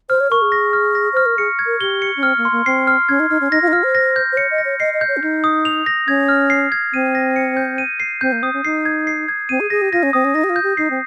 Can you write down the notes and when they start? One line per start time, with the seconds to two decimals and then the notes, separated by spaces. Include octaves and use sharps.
0.10 C5 F6
0.20 C#5
0.31 A#4 C#6
0.42 G#4
0.52 A#6
0.73 F6
0.95 A#6
1.13 C5 F6
1.26 A#4
1.38 G#4 C#7
1.59 G#6
1.66 A#4
1.81 G4 G7
2.02 C#7
2.17 C#4
2.23 C4 F6
2.38 A#3
2.45 C6
2.52 A#3
2.66 C4 C7
2.87 F6
3.09 C#4 G#6
3.20 D#4
3.30 D#4 F6
3.41 C#4
3.51 D#4 A#6
3.62 F4
3.68 D#4
3.73 F4 F6
3.83 C5
3.95 A#6
4.16 G6
4.32 C5
4.37 C#5 C#7
4.51 D#5
4.58 A#6
4.65 C#5
4.80 D#5 C7
4.94 D#5
5.01 G6
5.08 C#5
5.17 C#4
5.22 D#4 G6
5.44 D#6
5.65 F7
5.86 A#6
6.07 C#4 G#6
6.29 F6
6.50 C7
6.72 G#6
6.93 C4 D#7
7.15 A#6
7.36 C#7
7.57 G6
7.78 D#7
8.00 C7
8.21 C4 G6
8.32 A#3
8.43 C4 D#6
8.54 C#4
8.65 D#4 C7
8.85 G#6
9.07 C7
9.28 G#6
9.49 C4 D#7
9.60 G#4
9.70 G#4 A#6
9.82 G4
9.93 F4 A#6
10.03 C#4
10.13 C4 D#6
10.24 C#4
10.34 D#4 A#6
10.44 G4
10.49 F4
10.56 G6
10.63 G4
10.77 D#4 C7
10.91 C4